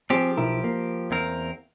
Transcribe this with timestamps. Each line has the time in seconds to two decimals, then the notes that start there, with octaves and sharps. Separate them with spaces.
0.10 F3 C4 G4 G#4
0.37 B1 E4 A#4
0.64 A#3
1.11 E2 C4 A#4